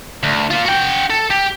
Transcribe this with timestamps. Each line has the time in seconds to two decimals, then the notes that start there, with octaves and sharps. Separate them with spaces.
0.23 D2
0.51 A#3 F4
0.65 F#4 G5
1.10 A4
1.30 G4